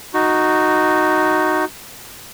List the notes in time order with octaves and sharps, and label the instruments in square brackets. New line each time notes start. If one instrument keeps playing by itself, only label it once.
[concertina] D#4 F#4